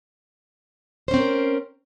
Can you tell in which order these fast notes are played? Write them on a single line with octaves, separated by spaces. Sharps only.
C5 C#4 C4 A#4